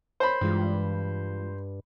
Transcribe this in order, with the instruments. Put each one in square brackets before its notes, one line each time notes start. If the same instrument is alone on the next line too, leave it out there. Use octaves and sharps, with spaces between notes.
[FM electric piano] A#4 C#5 [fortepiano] C5 B5
[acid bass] G2 [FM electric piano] E3 G#3 F4